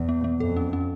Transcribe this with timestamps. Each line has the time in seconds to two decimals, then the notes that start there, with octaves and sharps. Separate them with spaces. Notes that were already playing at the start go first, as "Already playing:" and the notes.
Already playing: E2
0.09 B3
0.24 B3
0.40 F2 A4
0.57 C#4
0.73 C#4